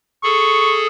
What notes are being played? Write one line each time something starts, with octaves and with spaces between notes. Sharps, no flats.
G#4 A4 C#6